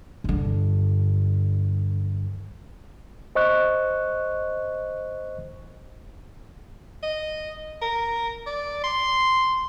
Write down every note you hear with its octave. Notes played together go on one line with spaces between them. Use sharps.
G2 D3
C5 D#5 C#6 F#6
D#5
A#4
D5
C6